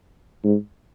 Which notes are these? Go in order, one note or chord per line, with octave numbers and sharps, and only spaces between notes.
G#2